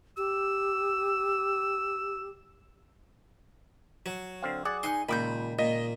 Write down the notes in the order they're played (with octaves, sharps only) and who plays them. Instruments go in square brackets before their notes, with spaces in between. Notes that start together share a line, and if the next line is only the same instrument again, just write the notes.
[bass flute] G4 [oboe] E6
[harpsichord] F#3 [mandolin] C#5
[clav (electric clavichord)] D3 C4 F5
[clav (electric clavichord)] G#4 D5 [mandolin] F#5
[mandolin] D#4 G#5 F#6 [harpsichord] C6
[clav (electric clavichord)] C#2 D#3 [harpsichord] A#2 [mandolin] B5 D6 G6
[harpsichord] A#2 [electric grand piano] D#5